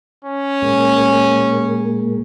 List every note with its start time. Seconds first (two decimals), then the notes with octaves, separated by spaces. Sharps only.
0.25 C#4
0.62 A#2 G#3 A#3